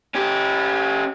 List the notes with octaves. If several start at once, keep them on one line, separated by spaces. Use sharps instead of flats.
C#4 G4